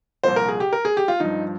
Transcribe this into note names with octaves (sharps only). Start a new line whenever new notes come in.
C2 A#2 F3 C5
A#4
G#4
G4
A#4
G#4
G4
F4
G2 F3 D#4